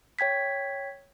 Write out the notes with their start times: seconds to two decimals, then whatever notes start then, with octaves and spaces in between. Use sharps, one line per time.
0.19 C#5 G5 G#6 B6